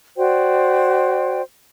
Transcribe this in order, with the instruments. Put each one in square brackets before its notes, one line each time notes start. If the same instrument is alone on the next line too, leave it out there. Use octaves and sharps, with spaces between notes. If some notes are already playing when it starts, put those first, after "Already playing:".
[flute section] F#4 C5 D5 G5